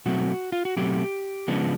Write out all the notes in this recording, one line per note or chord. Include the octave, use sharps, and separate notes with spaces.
B2 F#3 A3 C4 F#4
F4
F#4
B2 F#3 A3 C4 G4
C#3 F3 G#3 B3 D4